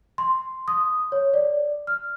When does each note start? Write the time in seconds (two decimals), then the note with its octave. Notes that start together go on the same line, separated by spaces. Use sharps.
0.18 C6
0.68 D#6
1.12 C#5
1.34 D5
1.87 F6